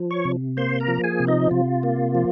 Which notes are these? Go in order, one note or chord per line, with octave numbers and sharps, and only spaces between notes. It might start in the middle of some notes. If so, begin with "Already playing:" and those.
Already playing: F3
C#5 C#6
C3
A#3 C5 C6
A#4 A#5
F3
G#4 G#5
C3
D#4 D#5
C3 F4
A#3
F3